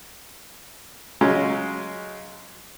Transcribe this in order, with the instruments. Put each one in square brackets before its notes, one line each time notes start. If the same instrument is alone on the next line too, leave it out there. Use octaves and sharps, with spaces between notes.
[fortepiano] C#3 F#3 G#3 C#4